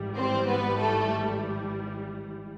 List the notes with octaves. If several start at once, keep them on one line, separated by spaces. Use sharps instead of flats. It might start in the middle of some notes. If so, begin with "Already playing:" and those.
Already playing: G#1 G#2 E3 G3
C4 C5
B3 B4
A3 A4